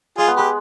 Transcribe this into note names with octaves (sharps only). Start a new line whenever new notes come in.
G#3 F4 G#4
B3
G#3 G4 B4